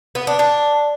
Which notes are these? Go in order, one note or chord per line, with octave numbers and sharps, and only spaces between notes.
B3
D4
D4